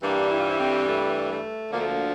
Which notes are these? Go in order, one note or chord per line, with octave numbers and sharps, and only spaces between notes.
G2 E3 G3 A#3 D4
E4
F4
C4 E4
A3 C4
A3
A3
D2 D3 F3 A#3
A3
A#3